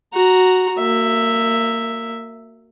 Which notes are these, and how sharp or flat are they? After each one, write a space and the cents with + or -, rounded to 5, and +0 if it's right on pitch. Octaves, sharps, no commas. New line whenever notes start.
F#4 +0 A#5 +0
A#3 -25 E5 +0